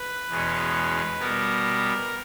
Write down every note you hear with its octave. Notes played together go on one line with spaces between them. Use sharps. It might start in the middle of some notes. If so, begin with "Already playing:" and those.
Already playing: B4
E2 B2 G#3 C#4
B2 G3 B3 A#4